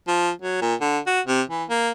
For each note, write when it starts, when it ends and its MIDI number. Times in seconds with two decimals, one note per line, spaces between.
0.07 0.31 53
0.42 0.58 54
0.61 0.74 46
0.81 0.98 50
1.06 1.20 66
1.26 1.41 48
1.50 1.64 52
1.69 1.91 58